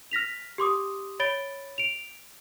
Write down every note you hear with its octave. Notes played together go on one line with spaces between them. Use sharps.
F6 A#6 B6 F7
G4 C6 D6 D#6
C#5 B5 A6 D7 G7
D7 F7